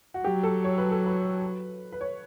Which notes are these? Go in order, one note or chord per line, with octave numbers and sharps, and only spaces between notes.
F#4
F#3 G4
A4
C#5
B4
A4
B4
B4
C#5